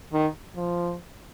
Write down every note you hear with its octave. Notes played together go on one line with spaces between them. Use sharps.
D#3
F3